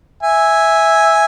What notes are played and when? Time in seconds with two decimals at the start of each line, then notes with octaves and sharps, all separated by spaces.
0.23 E5 G#5